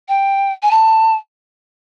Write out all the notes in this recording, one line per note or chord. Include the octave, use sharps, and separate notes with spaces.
G5
G#5
A5